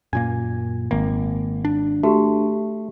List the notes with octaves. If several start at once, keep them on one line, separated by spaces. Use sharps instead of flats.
F#2 A#2 A#3 G#5
G#1 A#3
D4
A3 F#4 G4